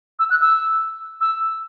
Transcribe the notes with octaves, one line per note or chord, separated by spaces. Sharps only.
E6
F#6
E6
E6